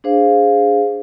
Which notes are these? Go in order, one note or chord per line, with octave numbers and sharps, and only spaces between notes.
D4 G#4 C5 F5